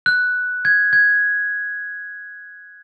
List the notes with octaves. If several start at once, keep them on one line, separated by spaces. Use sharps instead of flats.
F#6
G#6
G#6